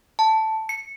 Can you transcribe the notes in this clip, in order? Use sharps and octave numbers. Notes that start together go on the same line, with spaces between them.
A5
C#7